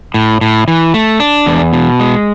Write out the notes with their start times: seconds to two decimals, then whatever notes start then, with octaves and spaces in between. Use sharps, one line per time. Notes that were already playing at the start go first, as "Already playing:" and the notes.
0.14 A2
0.41 A2
0.68 E3
0.94 A3
1.20 D4
1.46 E2
1.73 B2
2.00 G#3